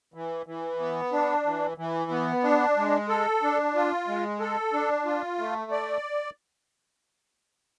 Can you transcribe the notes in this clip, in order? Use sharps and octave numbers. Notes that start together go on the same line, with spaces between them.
E3
E3
B3
D4
E3
E3
B3
D4
G#3
A4
D4
F4
G#3
A4
D4
F4
A3
D5